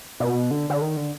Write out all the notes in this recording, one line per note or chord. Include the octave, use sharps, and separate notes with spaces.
B2
D3
D3
D#3
D3